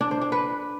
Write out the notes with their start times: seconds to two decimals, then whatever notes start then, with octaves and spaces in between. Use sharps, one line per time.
0.01 D4
0.11 C5
0.21 D4
0.32 B4